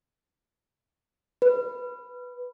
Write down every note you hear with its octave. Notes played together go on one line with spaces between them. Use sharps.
B4